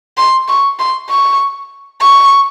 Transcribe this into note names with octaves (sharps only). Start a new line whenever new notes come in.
C6
C#6
C6
C#6
C#6